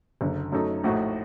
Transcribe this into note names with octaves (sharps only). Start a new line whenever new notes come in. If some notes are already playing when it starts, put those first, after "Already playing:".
F#1 F#2 D3
F#2 F#3 A3 D#4 A4
A#1 A2 A3 D#4 F#4